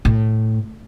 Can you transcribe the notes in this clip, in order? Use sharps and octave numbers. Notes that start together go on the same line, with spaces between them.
A2